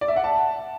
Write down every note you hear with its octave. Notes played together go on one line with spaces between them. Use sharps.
D5
E5
F#5
A5